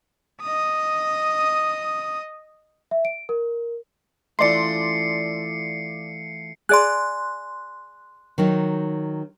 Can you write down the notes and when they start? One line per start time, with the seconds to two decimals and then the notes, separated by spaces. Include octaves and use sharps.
0.41 D#5 D#6
2.91 E5
3.05 D7
3.29 A#4
4.39 E3 F3 A3 D5 C6 C7 C#7
6.69 G#4 D5 C6 F#6
8.38 D#3 F#3 D#4